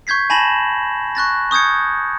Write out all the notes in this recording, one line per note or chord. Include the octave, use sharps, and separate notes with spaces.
C#6 G6 G#6 B6 C7
G#5 A5 B5 A#6 E7 F#7
C#6 F#6 A6 A#6
C#6 D#6 G6 G#6 C#7